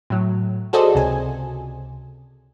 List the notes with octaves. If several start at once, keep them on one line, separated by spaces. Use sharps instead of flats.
A2 F#3
F#4 G#4 A4 C5 D5 D#5
C#2 C3 G#5